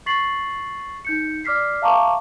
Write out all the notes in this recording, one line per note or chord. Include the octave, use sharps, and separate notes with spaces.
C#6 A6 B6 C7 F#7
D#4 G6 C#7
D5 D6 F6 B6 C7
E5 F5 A5 A#5 C#6 D6